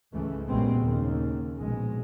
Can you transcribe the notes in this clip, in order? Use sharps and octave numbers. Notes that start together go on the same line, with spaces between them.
C#2 G#2 C#3 E3 A3
A#1 F#2 G3 G#3 B3 C4
D#2 C#3
A#1 B2 G#3